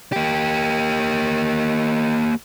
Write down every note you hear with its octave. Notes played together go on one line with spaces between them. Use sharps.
A#3 G4